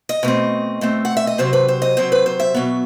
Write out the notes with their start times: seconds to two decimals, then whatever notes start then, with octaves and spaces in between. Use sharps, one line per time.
0.09 D#5
0.23 B2 A3 C4
0.81 B2 A3 C4
1.05 F#5
1.17 E5
1.27 D#5
1.38 C3 F#3 C4 C5
1.53 B4
1.68 C5
1.82 D#5
1.97 C3 F#3 C4 C5
2.12 B4
2.26 C5
2.40 E5
2.54 B2 F#3 B3